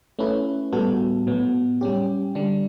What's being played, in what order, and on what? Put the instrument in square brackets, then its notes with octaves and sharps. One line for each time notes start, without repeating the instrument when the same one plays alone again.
[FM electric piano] A3 C#4 E4 B4
A2 G3 B3 F#4 A4
A2 F#3 B3
G3 C#4 G4
D3 G3 D4